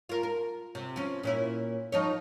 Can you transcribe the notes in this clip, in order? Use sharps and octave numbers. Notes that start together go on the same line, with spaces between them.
F4 A#4
A#4
C3
F3 C#4
A#2 C#4 E4
F3 D#4 C#5